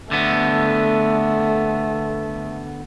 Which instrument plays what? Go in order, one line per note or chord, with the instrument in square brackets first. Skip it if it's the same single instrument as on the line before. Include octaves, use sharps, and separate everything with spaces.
[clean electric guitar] D3 B3 [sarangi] A3